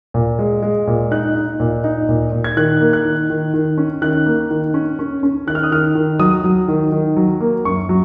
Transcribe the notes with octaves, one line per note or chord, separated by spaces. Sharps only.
A#2
G#3
G#3
A#2
D#4 F#6
D#4
A#2
D#4
A#2
A#2
G#6
D#3 F#6
A#3
F#6
D#3
D#3
D#3
C#4
D#3 F#6
A#3
D#3
C#4
C#4
C#4
D#3 F#6
F6
D#6
D#3 F6
D#3
F#3 D#6
F#3
D#3
D#3
F#3
A#3
F#2 C#6
F#3